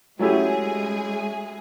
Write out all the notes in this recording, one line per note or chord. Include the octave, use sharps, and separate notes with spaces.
F#3 G#3 A3 C#4 E4 G4 G#4